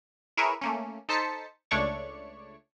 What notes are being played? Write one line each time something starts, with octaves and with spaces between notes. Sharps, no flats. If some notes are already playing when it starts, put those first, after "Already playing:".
E4 G#4 A#4 B4 C#5 E5
A3 A#3 C#4
D#4 A4 C5 A5 B6 C#7
C#2 A3 D4 C#5 D5 C#6